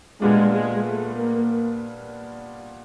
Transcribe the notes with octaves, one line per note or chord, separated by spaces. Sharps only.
A#2 G3 G#3 B3 D4 F4
G#3
A3
A#3